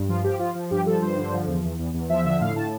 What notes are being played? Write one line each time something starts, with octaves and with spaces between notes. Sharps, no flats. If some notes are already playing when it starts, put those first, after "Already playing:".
Already playing: G2
F3 F4
F3 G4
F3 F4
F3
G2 G4
F3 A4
G2 C5
D3
F3
E2
E2
E2
E2
F3 E5
D3 E5
A2 F5
A2 A5